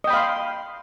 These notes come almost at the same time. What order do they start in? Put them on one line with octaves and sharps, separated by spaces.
D#5 G5 B5 F5 C6